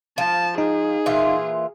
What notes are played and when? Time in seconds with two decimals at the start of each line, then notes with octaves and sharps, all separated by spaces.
0.18 F3 A5
0.58 D#4 G#4
1.06 A#2 E3 F4